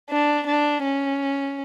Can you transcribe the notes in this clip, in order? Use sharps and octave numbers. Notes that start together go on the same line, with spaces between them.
D4
D4
C#4